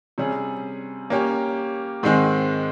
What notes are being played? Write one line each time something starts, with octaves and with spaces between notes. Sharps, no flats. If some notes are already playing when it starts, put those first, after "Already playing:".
C3 G3 C#4 G#4
A#3 C#4 G4 C#5
G#2 D#3 G#3 C4